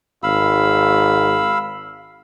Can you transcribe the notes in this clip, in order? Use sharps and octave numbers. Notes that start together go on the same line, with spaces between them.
G#1 F5 B5 E6